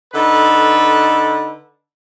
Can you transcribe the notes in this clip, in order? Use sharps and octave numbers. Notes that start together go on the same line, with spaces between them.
D3 D#4 A4 B4